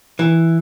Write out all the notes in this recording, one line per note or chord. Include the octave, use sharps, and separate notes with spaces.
E3